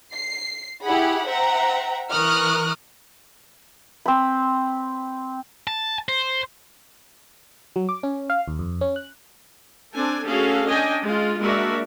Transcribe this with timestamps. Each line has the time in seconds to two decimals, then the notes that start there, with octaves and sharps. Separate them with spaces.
0.13 C7
0.83 E4 G4 G#4 F#5 B5
1.26 C5 E5 F#5 G5 A#5
2.11 E3 A#4 C#6 D#6 F6 F#6
4.06 C4 B5
5.67 A5
6.09 C5
7.76 F#3
7.89 D6
8.03 C#4
8.30 F5
8.48 D#2
8.59 F2
8.81 C#4
8.96 F#6
9.95 C4 D4 A4 G#5
10.26 A3 C#4 F#4 G#4 A4 F5
10.66 C#4 D4 D#5 G5 G#5
11.03 G#3 F4
11.40 G#3 A#3 D4 F#4 A#4 E5